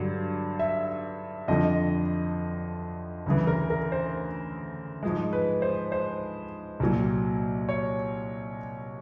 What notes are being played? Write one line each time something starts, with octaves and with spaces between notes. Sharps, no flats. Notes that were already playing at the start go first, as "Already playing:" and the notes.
Already playing: G2 D3 F#3
E5
F2 D3 F3 D#5
D2 C#3 E3
A#4
A#4
C5
G#2 F3 G#3
B4
C5
C5
C2 A#2 F#3
C#5